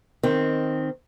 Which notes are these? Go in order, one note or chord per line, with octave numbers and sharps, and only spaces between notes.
D#3 C4